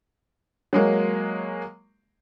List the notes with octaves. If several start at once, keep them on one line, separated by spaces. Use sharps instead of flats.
F#3 G#3 A#3